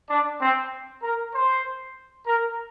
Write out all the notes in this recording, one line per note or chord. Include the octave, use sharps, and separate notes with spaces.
D4
C4
A#4
C5
A#4